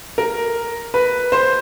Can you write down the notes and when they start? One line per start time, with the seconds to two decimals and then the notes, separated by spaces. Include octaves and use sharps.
0.18 A#4
0.94 B4
1.32 C5